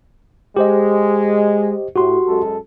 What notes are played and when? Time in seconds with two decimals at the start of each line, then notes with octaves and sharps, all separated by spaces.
0.56 G#3 G4 C5 D#5
1.96 A2 F#4 G4 C6
2.27 F#2 G#3 A4